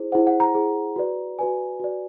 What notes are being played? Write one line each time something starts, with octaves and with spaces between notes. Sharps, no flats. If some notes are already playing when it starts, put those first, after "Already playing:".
Already playing: E4 G#4 C5
E4 G#4 C5 F#5
F#5
A#5
E4 G#4 C5
F#4 B4 D5
F#4 B4 D5 G#5
F#4 B4 D5